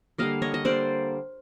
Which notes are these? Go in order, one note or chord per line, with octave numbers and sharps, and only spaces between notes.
D3 G3 A#3 D#5 F5
C#5 D#5
D#5
D3 G3 A#3 C5 D5